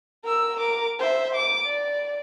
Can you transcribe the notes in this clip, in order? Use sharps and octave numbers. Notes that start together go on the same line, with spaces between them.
A#4 E6
A#4 D6
C5 E5
D6
D5